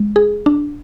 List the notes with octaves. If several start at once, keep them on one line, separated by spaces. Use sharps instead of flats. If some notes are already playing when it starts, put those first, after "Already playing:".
Already playing: G#3
G#4
D4